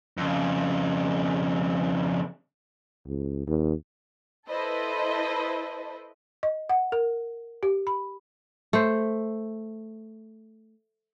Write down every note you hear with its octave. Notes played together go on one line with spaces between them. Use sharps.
F2 C#3
C#2
D#2
E4 A4 B4 C5 D#5
D#5
F#5
A#4
G4
B5
A3 C5